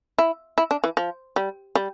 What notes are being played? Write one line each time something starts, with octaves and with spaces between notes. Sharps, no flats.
E4
E4
D4
E3
F3
G3
G3